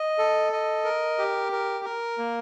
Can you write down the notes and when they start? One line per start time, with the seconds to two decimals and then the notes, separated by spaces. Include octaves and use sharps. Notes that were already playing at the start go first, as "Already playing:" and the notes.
Already playing: D#5
0.18 A4
0.52 D#5
0.85 A#4
1.18 G4
1.52 A#4
1.85 A#4
2.18 A#3